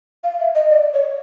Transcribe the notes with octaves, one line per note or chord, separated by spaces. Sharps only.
F5
E5
D#5
D5
C#5